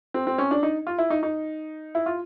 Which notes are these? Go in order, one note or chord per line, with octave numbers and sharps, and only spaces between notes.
C4
C4
C#4
D4
D#4
F4
E4
D#4
D#4
E4
F4